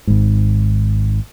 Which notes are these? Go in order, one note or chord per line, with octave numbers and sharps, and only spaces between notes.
G#1 G#2